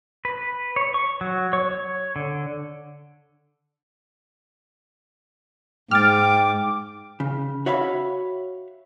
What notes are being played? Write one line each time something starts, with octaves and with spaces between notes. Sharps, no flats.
B4
C#5
C#6
F#3
C#5
C#5
D3
G#2 G5 D6 F6 A6
C#3
F#4 C#5 E5 F5 B5